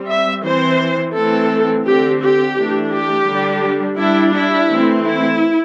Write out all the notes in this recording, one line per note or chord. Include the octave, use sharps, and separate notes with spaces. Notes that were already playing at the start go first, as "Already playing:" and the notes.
Already playing: G3 C4
E5
E3 C4 C5
E3 A3 C4 A4
D3 C4 G4
G4
E3 A3 D4
G4
D3 G3 D4
G3 D4 E4
E4
E3 A3 C4
E4